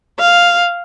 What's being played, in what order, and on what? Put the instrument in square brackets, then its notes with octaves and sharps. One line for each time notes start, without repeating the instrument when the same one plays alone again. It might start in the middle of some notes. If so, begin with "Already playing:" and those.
[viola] F5